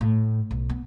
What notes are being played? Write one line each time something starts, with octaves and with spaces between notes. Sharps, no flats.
A2
B1
B3